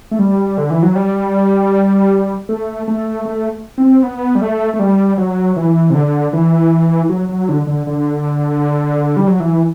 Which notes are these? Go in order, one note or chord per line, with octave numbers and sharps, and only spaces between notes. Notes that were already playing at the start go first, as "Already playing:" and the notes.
A3
G3
D3
E3
F#3
G3
A3
A3
A3
C4
B3
G3
A3
A3
G3
F#3
E3
C3
D3
E3
F#3
F#3
D3
D3
D3
G3
F#3
E3